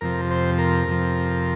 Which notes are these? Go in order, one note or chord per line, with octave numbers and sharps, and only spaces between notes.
F2 C3 F3 A#4
C5
A#4
F2 C3 F3